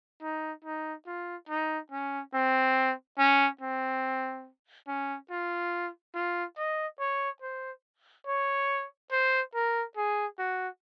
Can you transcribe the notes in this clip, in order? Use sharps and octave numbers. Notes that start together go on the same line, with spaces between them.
D#4
D#4
F4
D#4
C#4
C4
C#4
C4
C#4
F4
F4
D#5
C#5
C5
C#5
C5
A#4
G#4
F#4